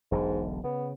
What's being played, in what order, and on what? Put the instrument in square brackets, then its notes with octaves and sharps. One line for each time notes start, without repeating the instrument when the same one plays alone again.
[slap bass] E1 B1 D3 [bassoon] G#2
[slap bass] C#3 [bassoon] B3